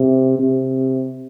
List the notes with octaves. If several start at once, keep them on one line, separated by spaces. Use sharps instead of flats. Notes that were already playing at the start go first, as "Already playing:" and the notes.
Already playing: C3
C3